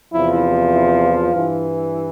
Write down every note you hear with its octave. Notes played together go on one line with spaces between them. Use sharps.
E2 C3 F3 E4
E4
F4
G2 E3